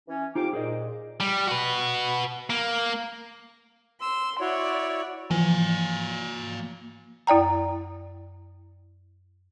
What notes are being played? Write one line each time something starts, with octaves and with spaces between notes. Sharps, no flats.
E3 C#4
F2 C4 D#4 F4 G4 D6
A#2 G#4 C5 D#5
G3
F#4 B4
A#3
C6 E6
E4 F#4 C#5 D5
E3 F3 A#3 G#5
F#2 E4 D5 G5 A#5